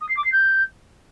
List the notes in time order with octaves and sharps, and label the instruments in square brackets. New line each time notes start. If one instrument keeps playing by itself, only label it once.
[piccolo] D#6
C7
D6
C7
G6